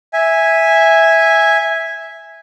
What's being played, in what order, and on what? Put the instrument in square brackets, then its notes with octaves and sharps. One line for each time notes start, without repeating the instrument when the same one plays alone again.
[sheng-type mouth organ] E5 G#5